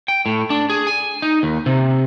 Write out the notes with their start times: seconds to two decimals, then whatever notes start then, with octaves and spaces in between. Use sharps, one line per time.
0.08 G5
0.26 A2
0.50 D4
0.70 G#4
0.87 G#5
1.22 D#4
1.43 D#2
1.66 C3